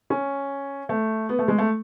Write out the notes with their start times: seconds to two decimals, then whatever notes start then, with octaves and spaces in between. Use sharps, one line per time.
0.10 C#4
0.89 A3
1.29 B3
1.39 A3
1.48 G#3
1.58 A3